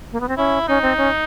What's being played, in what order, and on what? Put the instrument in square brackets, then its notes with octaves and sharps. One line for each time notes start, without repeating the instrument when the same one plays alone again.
[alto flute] A#3
B3
C4
[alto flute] C#4 [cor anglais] E4
[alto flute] C#4 [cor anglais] D#4
[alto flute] C4
C#4